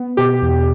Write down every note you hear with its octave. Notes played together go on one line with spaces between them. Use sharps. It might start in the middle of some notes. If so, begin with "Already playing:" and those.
Already playing: B3
B2 G4
E2